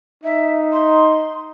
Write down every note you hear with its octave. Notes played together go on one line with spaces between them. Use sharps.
D#4 E5
C6